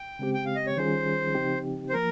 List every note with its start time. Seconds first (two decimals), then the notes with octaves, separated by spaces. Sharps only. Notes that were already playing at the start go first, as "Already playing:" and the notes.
Already playing: G5
0.19 C#3 G#3 C4 G4
0.34 G5
0.46 F5
0.55 D#5
0.67 C#5
0.77 D#3 G3 C#4 F4 G#4 C5
1.35 C#3 F3 C4 D#4 G4
1.89 C5
1.93 F3 A#3 A#4